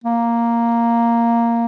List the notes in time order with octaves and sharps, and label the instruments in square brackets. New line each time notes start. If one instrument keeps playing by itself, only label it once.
[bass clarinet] A#3